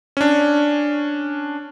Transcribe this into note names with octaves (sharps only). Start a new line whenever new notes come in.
C#4 D4